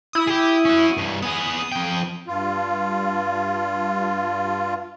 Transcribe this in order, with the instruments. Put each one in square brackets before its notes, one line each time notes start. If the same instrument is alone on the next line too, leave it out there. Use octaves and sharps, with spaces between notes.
[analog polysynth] E4 D#6
[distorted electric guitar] G4 G#4
C#4 F#4
G2 E3
[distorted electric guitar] B3 G#4 [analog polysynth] D#6
[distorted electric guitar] F2 G5
[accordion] G2 F4